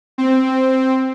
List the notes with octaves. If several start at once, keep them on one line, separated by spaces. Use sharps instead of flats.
C4